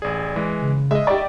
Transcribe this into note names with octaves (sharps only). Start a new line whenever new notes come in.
A1 G#4 D5
E3 G#3
C#3
G#3 D#5 E5
G4 D5 C#6